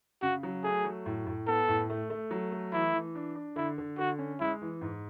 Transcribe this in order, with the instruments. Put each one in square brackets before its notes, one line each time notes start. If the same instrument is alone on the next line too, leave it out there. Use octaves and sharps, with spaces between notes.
[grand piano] C#3 [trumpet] F#4
[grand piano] F#3
[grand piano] A3 [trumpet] G#4
[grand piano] F#3
A2
A2
[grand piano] B3 [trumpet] A4
[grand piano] A2
A3
A3
F#3
A3
[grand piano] E3 [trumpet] E4
[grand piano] E3
D4
D4
[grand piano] D3 [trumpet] E4
[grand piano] D3
[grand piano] D3 [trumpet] F#4
[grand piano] C#4
[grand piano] G#3 [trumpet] E4
[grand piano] E3
G#2